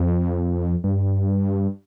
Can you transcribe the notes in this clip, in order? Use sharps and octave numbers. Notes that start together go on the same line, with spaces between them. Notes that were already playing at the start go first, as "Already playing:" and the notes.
Already playing: F2
G2